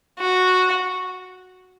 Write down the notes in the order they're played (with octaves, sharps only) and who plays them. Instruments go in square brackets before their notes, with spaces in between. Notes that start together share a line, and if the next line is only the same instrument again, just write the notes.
[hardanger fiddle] F#4